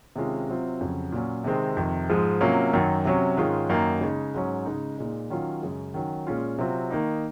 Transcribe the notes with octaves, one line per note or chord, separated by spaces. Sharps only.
C3 D#3 G#3 C#4 F4
C3 F#3 C4 F4
F2 C#3 F#3
A#2 F#3 C#4
C3 D#3 G#3 C4
F2 C3 D#3
G#2 F3 G#3
C3 F#3 A#3 C#4 F4
F#2 D#3 F#3
C3 F#3 C#4
G#2 D#3 G#3 C#4 F4
F#2 D#3 A#3 D#4
C#3 G#3 D#4
G#2 F#3 C#4
C#3 G#3 D#4
A#2 G#3 D#4
D#3 F#3 C#4 F4
F#2 C#3 G#3
D#3 F#3 C#4
A#2 G#3 C#4 F4
C3 F#3 C4 F4
D#3 A#3 D#4